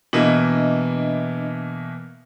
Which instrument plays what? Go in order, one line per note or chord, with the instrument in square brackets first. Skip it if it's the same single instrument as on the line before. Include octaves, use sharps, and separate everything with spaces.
[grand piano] B2 E3 A#3 [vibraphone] D4 D#5 E5